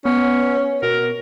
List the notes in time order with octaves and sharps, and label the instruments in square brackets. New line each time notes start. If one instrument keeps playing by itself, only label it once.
[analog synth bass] B3 [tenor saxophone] C#4
[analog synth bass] B2 [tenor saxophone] A#4